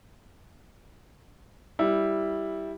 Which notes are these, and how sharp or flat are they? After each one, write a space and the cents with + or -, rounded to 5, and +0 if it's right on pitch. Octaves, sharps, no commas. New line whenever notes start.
G3 +0 E4 -5